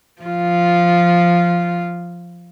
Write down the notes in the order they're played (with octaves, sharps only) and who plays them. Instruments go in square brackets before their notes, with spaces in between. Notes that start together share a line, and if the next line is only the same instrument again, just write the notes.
[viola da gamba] F3 F4